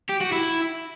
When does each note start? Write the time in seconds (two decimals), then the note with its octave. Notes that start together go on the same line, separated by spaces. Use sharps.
0.09 G4
0.21 F#4
0.32 E4